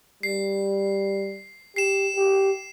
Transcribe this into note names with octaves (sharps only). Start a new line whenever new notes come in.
G3 C7
G4 C7 E7
G4